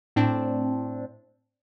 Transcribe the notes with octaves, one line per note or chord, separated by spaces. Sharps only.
A2 C4 D4